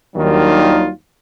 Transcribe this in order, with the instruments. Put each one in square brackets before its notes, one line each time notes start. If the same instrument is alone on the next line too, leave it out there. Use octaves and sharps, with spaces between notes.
[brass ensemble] D#2 D#3 F#3 G3 D4 F4